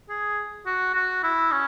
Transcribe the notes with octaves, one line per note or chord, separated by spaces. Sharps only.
G#4
F#4
F#4
E4
C#4